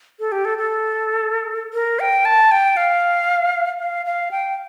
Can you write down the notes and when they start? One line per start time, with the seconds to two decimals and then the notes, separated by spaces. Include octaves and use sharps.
0.20 A4
0.32 G4
0.45 A4
0.58 A4
1.74 A#4
2.00 G5
2.25 A5
2.51 G5
2.77 F5
3.80 F5
4.06 F5
4.31 G5